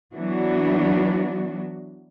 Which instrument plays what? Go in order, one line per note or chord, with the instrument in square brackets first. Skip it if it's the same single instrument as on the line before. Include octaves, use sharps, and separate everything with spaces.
[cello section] E3 F#3 B3 D4 F#4